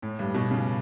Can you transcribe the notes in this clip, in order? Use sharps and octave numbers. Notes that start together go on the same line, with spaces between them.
A2
G2
B2
C#3